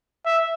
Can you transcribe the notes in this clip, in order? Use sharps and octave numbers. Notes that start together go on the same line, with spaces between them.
E5